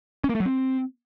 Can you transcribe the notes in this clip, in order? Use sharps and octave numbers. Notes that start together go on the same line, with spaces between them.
C#4
A#3
A3
F#3
C4